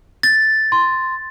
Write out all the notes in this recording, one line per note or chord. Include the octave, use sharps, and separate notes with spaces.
A6
C6